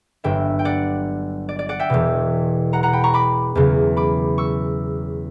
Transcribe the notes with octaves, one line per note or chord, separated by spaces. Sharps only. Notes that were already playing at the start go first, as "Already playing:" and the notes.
G1 G2 F#3 E5 G5
G5
D5 F#5
D5
D5
D5 F#5
E5 G5
E1 E2 B2
F#5 A#5
F#5 A#5
G5 B5
A#5 C#6
B5 D6
E2 C#3 F#3
B5 D6
C#6 E6